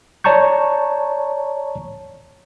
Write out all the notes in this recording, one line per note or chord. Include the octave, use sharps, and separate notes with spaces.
C#5 D5 A5 A#5 C#6 G6